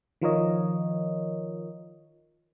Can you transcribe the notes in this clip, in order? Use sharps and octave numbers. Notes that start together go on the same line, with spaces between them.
D#3 F3 F4 A#4 C#5 D#5